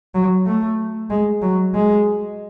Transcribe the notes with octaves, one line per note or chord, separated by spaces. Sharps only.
F#3
A3
G#3
F#3
G#3